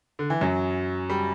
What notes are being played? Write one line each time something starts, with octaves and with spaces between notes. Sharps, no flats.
D3
E3
F#2 F#3
G3